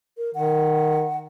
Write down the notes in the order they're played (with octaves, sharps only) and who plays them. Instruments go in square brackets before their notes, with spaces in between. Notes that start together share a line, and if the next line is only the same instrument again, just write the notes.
[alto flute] A#4
[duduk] D#3 [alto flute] F#5